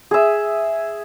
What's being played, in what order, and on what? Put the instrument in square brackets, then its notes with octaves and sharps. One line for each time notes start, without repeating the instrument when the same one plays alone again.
[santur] G#4 E5